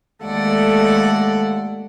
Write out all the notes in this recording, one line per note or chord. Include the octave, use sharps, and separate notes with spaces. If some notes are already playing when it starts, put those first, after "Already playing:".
D#2 G#3 A3 A4 D5 F#5